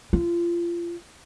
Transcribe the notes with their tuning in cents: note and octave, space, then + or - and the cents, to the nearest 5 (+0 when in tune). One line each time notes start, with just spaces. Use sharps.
F4 -30